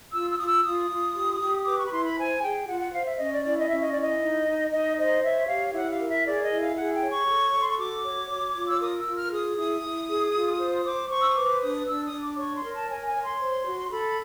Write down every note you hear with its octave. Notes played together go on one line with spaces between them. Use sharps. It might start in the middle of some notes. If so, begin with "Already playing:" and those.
F4 E6
E6
F4 D#6
E6
F4 D#6
F4
G4
G4
B4 D6
C#6
B5
E4 C6
B5
C5 G#5
G#4 G5
F4 F#5
F#5
C5 F5
E5
C#4 D#5
D5
E4 D5
D#5
C#4 E5
D#5
E4 D5
D#5
D#4
D#4
D#4 D#5
C5 D#5
C#5 E5
G4 F5
E4 F#5
F5
A#4
E5
G#4 D5
D#5
E4
F5
G#4 F#5
G5
C#5
C#6
A4
A4
C6
C#6
F#4 D6
C#5
C#5
F4
E6
A#4 D#6
E6
F4
F6
G#4 D#6
E4 D#6
E4
G#4
F4
C5
C5 D6
C5 C#6
E6
D#6
B4 D6
D4 D#6
D4 E6
D#6
D4
D6
C#5 C#6
C6
A#4
A5
C#5 G#5
G#5
C#5
C6
C5
F#4
A4 B5